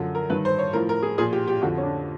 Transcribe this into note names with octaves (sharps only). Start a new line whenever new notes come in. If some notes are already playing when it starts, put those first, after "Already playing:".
Already playing: F#2 D3 F3
A#4
G2 D#3 B4
C5
C#5
A2 F3 A#4
A#4
G#4
A#2 F3 G#4
G4
G4
F2 D3 F3 F#4
C#4
D4